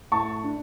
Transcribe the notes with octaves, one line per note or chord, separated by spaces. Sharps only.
A2 A5 C#6
D4